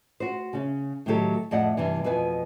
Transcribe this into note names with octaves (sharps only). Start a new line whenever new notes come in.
F#4 C5
C#3 C#4
A2 C3 D#3 F#3 G4 A4
F2 A2 D5 D#5 F#5
G2 C3 E3
F2 B2 B4 G#5